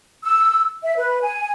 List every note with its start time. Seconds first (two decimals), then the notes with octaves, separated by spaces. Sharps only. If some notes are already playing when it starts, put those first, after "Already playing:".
0.24 E6
0.84 E5
0.96 B4
1.22 G#5